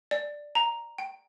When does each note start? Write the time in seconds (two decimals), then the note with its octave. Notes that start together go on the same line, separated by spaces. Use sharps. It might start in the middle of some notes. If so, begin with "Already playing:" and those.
0.11 D5
0.55 A#5
0.98 G5